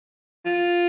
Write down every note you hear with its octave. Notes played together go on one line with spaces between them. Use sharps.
F4